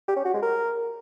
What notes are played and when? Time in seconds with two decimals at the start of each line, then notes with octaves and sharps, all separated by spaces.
0.08 G4
0.17 C#4
0.25 F#4
0.34 G#3
0.43 A#4